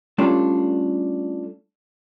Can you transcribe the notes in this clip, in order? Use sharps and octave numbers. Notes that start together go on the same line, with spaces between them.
G3 A3 C#4 D4 F4 A4